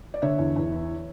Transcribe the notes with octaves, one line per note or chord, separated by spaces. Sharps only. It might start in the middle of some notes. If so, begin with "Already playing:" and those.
D5
D3 C#5 E5
E2
E2
E3